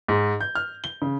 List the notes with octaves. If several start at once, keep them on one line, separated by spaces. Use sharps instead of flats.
G#2
G6
F6
G7
C#3